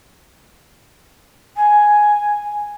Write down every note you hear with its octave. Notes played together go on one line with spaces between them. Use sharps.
G#5